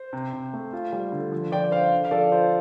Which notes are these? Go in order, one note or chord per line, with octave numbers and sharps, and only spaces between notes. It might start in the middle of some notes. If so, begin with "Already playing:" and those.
Already playing: C5
C3
C3
A3
F4
G3
D3
F3
F3 D5 G5
D4 C5 F5
D3
F5
F3 A4 D5
F4 C5